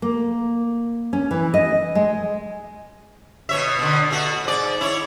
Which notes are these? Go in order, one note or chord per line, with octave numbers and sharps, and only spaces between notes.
A#3
C#4
E3
D#5
G#3
B2 C#5 E5
B2 D3
B2 A3 F#4
G#2 D5
E4 C#5